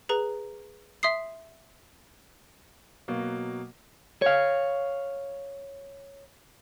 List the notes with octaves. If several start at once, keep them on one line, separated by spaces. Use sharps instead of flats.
G#4 B4 A#5
E5 C6 D#6 C7
B2 F#3 A#3
C#5 F5